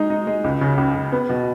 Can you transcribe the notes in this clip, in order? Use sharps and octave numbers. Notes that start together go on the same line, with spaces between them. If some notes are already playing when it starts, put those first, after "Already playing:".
Already playing: G#3 D#4
D#4
G#3
C#2
C#3
C#2
C#2
B3
B2